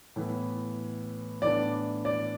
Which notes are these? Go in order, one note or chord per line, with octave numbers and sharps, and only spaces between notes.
A2 E3 B3
A2 E3 B3 D4 D5
D5